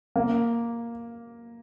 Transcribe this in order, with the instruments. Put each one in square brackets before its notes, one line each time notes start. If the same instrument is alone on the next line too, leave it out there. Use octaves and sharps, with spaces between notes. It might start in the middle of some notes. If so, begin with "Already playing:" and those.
[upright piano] A#3